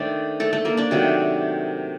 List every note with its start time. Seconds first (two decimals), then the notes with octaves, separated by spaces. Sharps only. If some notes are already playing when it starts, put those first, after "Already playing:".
Already playing: D#3 A3 D4 C5 D5
0.40 A3 A4
0.53 A3 A4
0.65 A#3 A#4
0.77 D4 D5
0.91 C3 D#3 F#3 A3